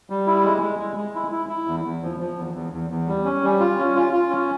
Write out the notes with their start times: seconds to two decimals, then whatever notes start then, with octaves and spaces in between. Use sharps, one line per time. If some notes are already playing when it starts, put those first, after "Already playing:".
0.10 G3
0.27 E4
0.44 G#3
0.62 G#3
0.79 G#3
0.97 G#3
1.15 E4
1.32 E4
1.49 E4
1.68 E2
1.84 E2
2.02 F3
2.20 F3
2.37 E2
2.54 E2
2.73 E2
2.91 E2
3.07 G3
3.25 C#4
3.43 G3
3.60 F4
3.78 C#4
3.96 F4
4.13 F4
4.30 C#4